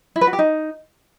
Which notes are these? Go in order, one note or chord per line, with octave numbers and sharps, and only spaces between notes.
E4
B4
F#4
G4
D#4